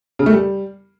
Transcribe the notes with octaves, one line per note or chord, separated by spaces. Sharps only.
C#3
A3
G3